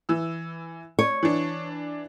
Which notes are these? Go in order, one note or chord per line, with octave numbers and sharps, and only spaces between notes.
E3 E6
C#5
E3 D4